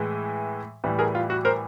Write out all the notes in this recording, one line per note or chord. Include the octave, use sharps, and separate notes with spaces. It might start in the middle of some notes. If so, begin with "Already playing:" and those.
Already playing: A2 E3 G#3
A2 E3 G3
G#4 A#4
F4
F#4
A#4 C5